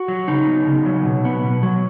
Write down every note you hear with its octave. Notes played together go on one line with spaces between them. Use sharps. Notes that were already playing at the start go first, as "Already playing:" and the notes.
Already playing: F#4
F#3
C#3 D#4
B3
C#3
F#3
B2
B3
B2
F#3